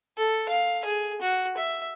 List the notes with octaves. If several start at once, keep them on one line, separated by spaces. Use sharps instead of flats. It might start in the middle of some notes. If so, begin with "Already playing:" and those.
A4
F5
G#4
F#4
E5